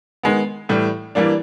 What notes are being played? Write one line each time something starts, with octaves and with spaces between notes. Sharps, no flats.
D#3 G#3 B3
A2 E3 G3
E3 G3 A#3 D4